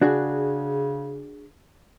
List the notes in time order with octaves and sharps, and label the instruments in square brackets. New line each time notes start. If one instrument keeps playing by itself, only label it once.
[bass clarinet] C#3 [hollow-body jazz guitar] D4 F#4 G#4